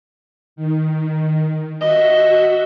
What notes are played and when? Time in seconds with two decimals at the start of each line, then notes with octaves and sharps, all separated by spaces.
0.56 D#3
1.81 F#4 D#5 E5